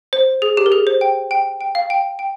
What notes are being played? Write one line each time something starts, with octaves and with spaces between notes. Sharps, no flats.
C5
G#4
G4
A#4
G#4
C5
G5
G5
G5
F5
G5
G5